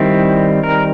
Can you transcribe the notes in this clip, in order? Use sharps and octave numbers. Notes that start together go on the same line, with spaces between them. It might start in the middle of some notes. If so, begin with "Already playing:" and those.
Already playing: D#3 G3 C4 E4
A#4